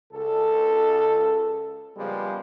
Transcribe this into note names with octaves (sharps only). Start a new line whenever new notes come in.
C#2 A4
C#3 F3 G3 G#3 A#3 B3